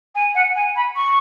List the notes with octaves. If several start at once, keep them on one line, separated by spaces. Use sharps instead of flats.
G#5
F#5
G#5
B5
C#6